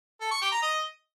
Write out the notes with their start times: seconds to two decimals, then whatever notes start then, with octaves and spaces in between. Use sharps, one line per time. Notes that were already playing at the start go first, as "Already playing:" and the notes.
0.21 A4
0.31 C#6
0.42 G4
0.52 A#5
0.62 D#5